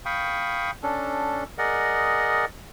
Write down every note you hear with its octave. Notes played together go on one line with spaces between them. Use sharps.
F5 G5 B5 C#6 D#6
C#4 D4 A4
G#4 A#4 D5 D#5 F#5